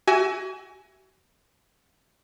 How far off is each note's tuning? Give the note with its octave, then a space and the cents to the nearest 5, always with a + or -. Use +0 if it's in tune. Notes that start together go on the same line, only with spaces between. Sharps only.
F#4 +40 E5 +0 G#5 +10